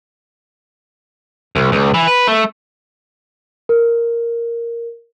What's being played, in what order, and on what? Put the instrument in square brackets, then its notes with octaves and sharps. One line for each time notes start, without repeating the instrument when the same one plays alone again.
[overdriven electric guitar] C2
C#2
E3
B4
A3
[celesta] A#4